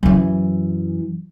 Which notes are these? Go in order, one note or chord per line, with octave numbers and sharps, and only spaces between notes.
F#2 E3